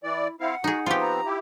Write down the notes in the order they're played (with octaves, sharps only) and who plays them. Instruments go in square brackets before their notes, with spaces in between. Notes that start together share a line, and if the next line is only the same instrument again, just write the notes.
[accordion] E3 D5 [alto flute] E4
[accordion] C4 E4 F5 [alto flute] F#5
[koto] D#4 G#4 [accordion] F#4
[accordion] F3 B3 C4 [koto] F4 G4
[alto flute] A#5
[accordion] E4 G4